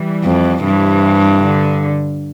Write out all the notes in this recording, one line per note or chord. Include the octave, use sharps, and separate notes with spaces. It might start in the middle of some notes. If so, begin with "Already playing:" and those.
Already playing: E3 G3
F2
G2 C3 E3
D3